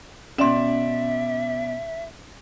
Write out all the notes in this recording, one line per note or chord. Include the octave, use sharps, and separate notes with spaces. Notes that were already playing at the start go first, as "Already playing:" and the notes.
B2 C#4 D5 E5 C6 E7